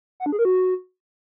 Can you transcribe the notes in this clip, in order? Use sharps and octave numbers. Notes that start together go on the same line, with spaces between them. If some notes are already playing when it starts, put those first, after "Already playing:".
F#5
D4
G#4
A#4
F#4